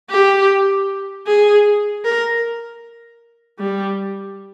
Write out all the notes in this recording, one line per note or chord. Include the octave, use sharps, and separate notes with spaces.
G4
G#4
A#4
G3